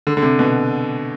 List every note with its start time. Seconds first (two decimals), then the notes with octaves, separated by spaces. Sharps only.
0.07 D3
0.17 D3
0.22 C3
0.39 B2